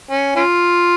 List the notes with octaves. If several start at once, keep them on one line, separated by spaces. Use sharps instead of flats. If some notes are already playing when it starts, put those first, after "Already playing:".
C#4
C#4 F4